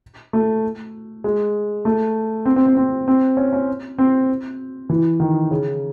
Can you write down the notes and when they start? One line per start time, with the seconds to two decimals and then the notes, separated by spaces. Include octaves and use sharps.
0.33 A3
1.24 G#3
1.85 A3
2.45 C4
2.56 C4
2.66 C4
2.77 C4
3.08 C4
3.37 C#4
3.53 C#4
3.98 C4
4.90 E3
5.20 D#3
5.51 C#3